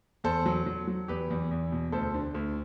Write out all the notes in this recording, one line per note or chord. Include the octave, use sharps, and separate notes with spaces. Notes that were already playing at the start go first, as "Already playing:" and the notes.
E2 A4 C5
F#3
F#3
F#3
E2 G4 B4
E2
E2
B2
D2 A4 C5
D3
D2